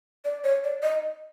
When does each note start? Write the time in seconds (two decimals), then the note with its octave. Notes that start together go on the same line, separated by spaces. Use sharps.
0.25 D5
0.44 C#5
0.64 D5
0.83 D#5